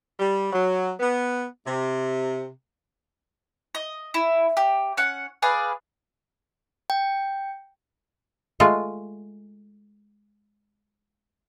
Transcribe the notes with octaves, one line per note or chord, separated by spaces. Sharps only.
G3
F#3
B3
C3
D#5
E4
G4
C#4 F#5
G#4 B4 D5 F5
G5
G#3 A3 F4